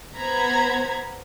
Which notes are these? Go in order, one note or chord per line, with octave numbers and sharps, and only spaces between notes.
B3 C5 A#5 B5 G#6